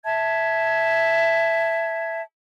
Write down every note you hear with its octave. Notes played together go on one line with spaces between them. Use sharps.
E5 A5 G#6